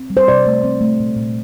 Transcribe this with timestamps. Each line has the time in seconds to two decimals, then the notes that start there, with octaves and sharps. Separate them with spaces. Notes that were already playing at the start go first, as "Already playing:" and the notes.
Already playing: C4
0.10 G3
0.17 C5
0.28 C3 D5
0.46 A3
0.64 C4
0.81 A3
1.00 A#2
1.16 A#2